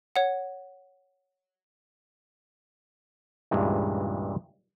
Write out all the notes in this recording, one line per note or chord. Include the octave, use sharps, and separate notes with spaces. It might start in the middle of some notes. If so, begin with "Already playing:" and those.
C#5 F#5
C#2 G2 A#2 E3 G#3